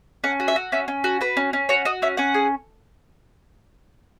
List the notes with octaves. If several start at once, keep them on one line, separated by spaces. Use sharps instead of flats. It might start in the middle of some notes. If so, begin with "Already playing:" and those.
C#4 F#5
F#4
E5
F#4
C#4 E5
C#4
F#4
F#4 B4
C#4
C#4
F#4 C#5
F#4 D#5
C#4 E5
C#4 F#5
G#4